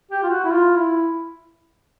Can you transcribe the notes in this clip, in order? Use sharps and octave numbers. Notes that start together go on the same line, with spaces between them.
G4
F4
F#4
E4
F4
E4